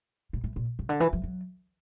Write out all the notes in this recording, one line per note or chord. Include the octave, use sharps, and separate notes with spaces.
A2
A2
A#2
C#3
D3
E3
F3
F#3